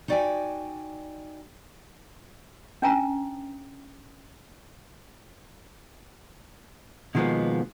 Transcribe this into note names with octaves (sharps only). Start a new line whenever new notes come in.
D#4 F#4 D5 F5 G5 G#5
C#4 D4 G5 A5 A#5
B2 D#3 F3 G#3 A#3 B3